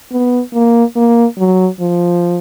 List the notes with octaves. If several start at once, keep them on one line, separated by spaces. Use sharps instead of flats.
B3
A#3
A#3
F#3
F3